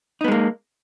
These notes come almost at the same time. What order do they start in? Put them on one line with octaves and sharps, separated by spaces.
D#4 B3 G#3 A#3